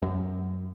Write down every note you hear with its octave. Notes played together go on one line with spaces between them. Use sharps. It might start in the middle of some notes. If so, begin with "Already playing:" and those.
F#2